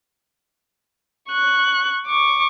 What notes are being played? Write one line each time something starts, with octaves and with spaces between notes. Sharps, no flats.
C#6 F#6
C#6 D6